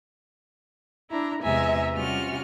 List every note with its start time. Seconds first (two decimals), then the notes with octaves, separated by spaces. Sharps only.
1.10 D4 E4 A#5
1.43 E2 C3 G#3 E5 G#5 A#5
1.95 C3 G3 C#4 F4 F#4 F6